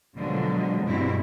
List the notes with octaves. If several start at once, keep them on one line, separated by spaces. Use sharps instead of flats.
B2 D3 F3 F#3 G#3
G2 B2 G#3 C4 E4